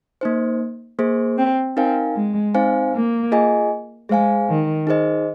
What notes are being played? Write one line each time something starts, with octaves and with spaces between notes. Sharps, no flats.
A#3 D#4 C5
A#3 G#4 C5
C4
C4 D#4 A#4 F5 G#5
G#3
C4 D#4 C5 F5 G#5
A#3
F4 G#4 D#5 G#5
G#3 G#4 C5 F5 G#5
D#3
D#4 G#4 C5 D#5